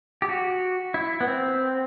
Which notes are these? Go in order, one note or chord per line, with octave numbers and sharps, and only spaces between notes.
G4
F#4
E4
B3
C4